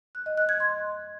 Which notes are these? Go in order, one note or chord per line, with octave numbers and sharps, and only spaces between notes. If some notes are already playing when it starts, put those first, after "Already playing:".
F#6
D#5
F#6
G#6
C6